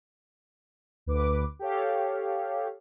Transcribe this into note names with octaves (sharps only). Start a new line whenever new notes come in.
D2 B4 D6
G4 A4 C#5 F5